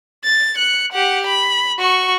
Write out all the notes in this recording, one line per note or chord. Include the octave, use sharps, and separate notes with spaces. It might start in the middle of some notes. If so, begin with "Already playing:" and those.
A6
F#6 C#7
G4 F#5
B5
F#4 C#6